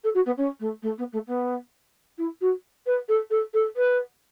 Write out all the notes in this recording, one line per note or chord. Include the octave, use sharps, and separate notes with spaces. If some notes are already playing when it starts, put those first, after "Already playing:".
A4
F#4
B3
C#4
A3
A3
B3
A3
B3
E4
F#4
B4
A4
A4
A4
B4